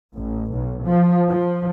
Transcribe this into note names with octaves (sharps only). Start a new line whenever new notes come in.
A1
B1
F3
F3